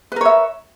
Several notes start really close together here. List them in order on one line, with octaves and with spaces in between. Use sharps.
B4 A#4 C#5 E5